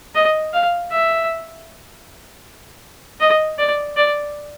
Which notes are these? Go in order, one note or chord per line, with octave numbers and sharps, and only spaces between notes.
D#5
F5
E5
D#5
D5
D5